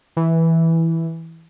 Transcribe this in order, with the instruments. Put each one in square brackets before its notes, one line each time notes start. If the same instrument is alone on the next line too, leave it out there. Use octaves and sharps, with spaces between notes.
[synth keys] E3